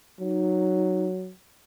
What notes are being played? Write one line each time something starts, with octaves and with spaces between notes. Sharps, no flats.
F#3 D#4